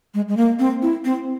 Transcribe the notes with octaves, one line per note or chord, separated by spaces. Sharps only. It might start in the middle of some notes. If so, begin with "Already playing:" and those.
G#3
G#3
A#3
C4
E4
C4